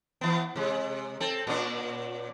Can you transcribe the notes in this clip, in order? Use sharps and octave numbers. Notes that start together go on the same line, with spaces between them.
E3 B3
C3 G#3
C4 A4
A#2 C#4 D4